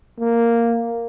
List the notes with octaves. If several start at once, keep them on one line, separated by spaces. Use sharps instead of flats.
A#3